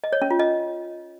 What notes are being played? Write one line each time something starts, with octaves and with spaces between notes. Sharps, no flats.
D#5
C#5
C#4
F4
D#5